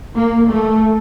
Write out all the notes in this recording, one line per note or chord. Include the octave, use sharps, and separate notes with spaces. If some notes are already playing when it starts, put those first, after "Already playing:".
A#3
A3